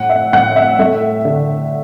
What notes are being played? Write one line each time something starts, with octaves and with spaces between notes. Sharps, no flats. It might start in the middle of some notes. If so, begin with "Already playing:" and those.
Already playing: A2 F#5
E5
A2 F#5
E5
A3 E5
D3